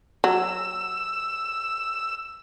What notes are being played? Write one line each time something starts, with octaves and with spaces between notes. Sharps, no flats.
F#3 E6